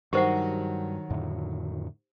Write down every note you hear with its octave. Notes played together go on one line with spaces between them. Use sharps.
G2 D#3 F#3 F#4 G4 C5 F#5
F2 A2 D3